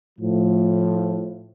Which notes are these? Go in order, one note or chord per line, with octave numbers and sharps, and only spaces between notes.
A2 F3